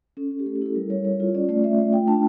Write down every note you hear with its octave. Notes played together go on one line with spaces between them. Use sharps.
C#4 A4
C#4
G4
A3 A4
G4
E4 A4
G3 A#4
G3 C#5
G3 C#5
F4
C#4 D5
A3 D5
A3 E5
A3
F4 G5
D4 A5